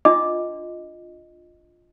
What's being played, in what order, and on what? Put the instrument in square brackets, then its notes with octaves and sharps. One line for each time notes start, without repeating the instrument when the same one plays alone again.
[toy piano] D4 F4 D#5 [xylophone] D6